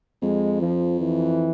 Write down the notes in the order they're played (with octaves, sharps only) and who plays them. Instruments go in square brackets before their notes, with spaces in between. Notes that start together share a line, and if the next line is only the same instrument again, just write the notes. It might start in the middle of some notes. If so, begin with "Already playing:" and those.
[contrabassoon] F2 [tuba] G#3
[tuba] F3
E3